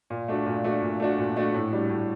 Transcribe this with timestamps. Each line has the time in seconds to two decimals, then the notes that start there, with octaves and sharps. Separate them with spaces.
0.10 A#2
0.28 A3 D4 F#4
0.46 A#2
0.64 A3 D4 F#4
0.82 A#2
1.00 A3 D4 F#4
1.18 A#2
1.37 A3 D4 F#4
1.54 A2
1.72 G3 D4 F#4
1.90 A2